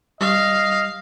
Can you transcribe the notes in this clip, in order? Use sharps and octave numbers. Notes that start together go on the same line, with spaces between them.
G3 D#5 F5